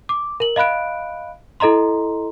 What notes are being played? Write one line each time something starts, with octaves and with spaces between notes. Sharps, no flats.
D6
A#4 F#7
D#5 F5 B5 F#6 D7
E4 A4 D#5 A#5 C6